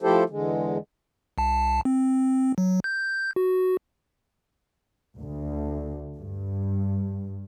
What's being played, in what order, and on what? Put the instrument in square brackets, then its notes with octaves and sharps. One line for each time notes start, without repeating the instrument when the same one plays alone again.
[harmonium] F3 A3 E4 G4 A4 C5
E2 D3 G#3
[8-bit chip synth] C2 A5
C4
F#3
G6
F#4
[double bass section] D2
G2